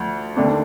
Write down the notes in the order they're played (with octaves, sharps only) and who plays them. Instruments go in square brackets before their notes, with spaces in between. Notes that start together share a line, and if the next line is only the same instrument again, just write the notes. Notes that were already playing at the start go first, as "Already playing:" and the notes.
Already playing: [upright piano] D2 F3
D#2 D3 A3 D4